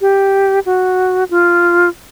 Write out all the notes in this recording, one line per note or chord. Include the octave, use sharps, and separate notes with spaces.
G4
F#4
F4